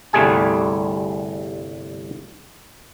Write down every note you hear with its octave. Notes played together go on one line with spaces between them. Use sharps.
G1 C2 G3 A3 G#4 G#5